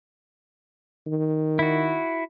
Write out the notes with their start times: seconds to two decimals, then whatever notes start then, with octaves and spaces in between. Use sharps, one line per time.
1.07 D#3
1.59 E4 F#4